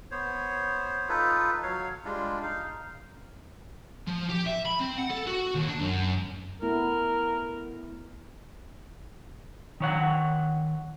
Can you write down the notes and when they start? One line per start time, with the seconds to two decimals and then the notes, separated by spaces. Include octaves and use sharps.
0.11 B3 C5 C#5
1.09 D#4 F4 A4 B4
1.63 F#3 C#5 F5
2.05 G3 G#3 D4 F4
2.42 D#4 F5
4.07 F3
4.29 G4
4.46 E5
4.65 B5
4.80 C4
4.98 F#5
5.10 A4
5.27 F#4
5.55 D#2
5.68 D4
5.80 F#2
6.62 A3 B3 E4 A#4
9.80 D#3 C#5 F#5